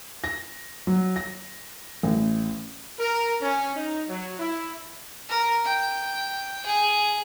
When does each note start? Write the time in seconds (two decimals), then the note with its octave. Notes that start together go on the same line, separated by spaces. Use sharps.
0.24 A#6
0.87 F#3
1.16 A#6
2.03 A1
2.99 A#4
3.41 C#4
3.75 D#4
4.08 F#3
4.39 E4
5.29 A#4
5.65 G5
6.66 G#4